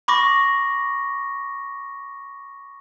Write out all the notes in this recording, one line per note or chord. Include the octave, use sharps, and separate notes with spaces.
B5 C#6 D6 A#6